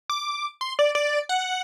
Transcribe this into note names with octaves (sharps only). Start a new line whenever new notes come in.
D6
C6
D5
D5
F#5